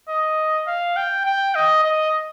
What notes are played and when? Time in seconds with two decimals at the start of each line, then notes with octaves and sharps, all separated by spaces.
0.09 D#5
0.67 F5
0.96 G5
1.26 G5
1.55 D#5
1.84 D#5